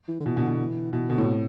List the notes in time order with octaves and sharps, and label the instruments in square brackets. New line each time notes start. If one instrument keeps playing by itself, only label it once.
[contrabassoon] E3
D3
[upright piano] B2 [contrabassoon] E3
[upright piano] B2 D3
B2
[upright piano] B2 [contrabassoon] E3
[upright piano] B2 [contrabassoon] D3
[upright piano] A2
[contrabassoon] C3